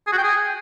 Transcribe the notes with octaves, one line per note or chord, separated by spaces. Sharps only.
G#4
F#4
G5
G#4